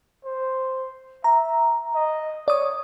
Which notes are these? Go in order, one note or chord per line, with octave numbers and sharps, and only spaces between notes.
C5
E5 A#5
D#5
C#5 D5 D#6